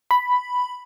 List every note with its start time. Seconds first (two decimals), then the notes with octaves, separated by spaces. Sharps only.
0.11 B5